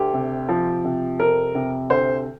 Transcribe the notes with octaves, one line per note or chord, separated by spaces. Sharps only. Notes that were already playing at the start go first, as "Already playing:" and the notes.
Already playing: D2 G4
C3
F3
C3
F2 A#4
C3
D2 C5